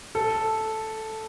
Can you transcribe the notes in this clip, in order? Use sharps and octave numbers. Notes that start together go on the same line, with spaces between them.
A4